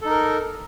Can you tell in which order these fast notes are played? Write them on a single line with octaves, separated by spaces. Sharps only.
A4 D#4 A#4